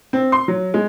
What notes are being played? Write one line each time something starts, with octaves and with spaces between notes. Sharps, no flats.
C4
C6
F#3
G#3